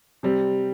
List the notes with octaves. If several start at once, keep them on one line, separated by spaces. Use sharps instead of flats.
C3 G3 C4